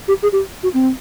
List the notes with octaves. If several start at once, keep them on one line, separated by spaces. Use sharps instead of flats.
G4
G#4
G4
F#4
C4